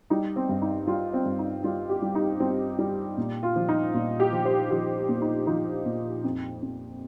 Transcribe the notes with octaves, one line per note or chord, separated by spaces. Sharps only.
G3 D#4
C4
G2
D#4
G3 F4
C4
G2
D#4
G3 F4
G4
G3
D#4
G3 C4
G3
A#2
F4
F3
D#4
A#2 F4
G4
F3
C5
F3 G4
A#2
D#4
F3 D#4
A#2
F2
F2